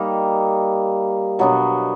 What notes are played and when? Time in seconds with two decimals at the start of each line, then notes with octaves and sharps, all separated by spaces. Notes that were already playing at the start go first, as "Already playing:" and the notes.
Already playing: G3 A#3 D#4
1.39 B2 F#3 B3 D4